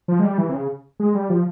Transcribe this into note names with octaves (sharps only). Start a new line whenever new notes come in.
F3
G#3
G3
E3
C3
C#3
G#3
G3
F3